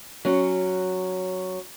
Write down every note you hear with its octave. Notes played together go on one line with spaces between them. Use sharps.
F#3 C#4